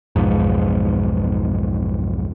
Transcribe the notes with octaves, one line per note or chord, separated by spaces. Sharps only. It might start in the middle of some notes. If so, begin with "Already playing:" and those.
B1 F2 G#2